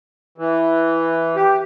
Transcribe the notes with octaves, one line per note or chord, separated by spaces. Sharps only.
E3
G4